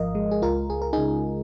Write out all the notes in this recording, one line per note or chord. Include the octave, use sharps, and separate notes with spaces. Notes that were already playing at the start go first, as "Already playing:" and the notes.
Already playing: G#1 G#2 F3 A#4 D#5 F5
G#3
G#4
C#2 F4 A#4
C#2 G#4
A#4
C#3 D#4 G#4